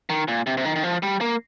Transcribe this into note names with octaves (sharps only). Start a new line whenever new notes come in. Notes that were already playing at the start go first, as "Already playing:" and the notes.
D#3
A#2
C3
C3
D#3
D#3
F3
G3
A#3